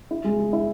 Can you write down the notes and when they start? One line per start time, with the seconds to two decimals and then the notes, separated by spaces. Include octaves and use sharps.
0.11 E4
0.24 G#3
0.39 G#3
0.53 E4